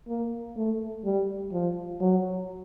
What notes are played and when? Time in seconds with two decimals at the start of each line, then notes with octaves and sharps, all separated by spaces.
0.08 A#3
0.57 A3
1.05 G3
1.53 F3
2.01 F#3